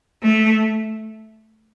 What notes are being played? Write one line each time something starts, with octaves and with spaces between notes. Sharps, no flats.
A3